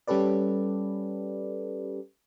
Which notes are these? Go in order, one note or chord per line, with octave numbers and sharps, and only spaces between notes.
G3 C#4 G4 A4 B4 D5